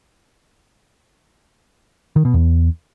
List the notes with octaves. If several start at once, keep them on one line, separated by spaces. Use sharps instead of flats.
D#3
B2
E2